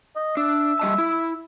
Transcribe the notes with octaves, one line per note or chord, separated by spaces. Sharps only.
D#5
D4 E5
G3 D#5 A5
E4